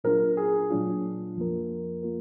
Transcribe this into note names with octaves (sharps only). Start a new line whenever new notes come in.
A#2 F#3 D4 F4 A#4
G#4
A#2 F#3 D4 F4
F2 F3 A#3 F4 A#4
A#3 F4 A#4